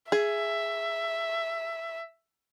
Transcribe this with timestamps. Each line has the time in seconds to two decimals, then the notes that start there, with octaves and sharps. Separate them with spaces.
0.12 G#4 E5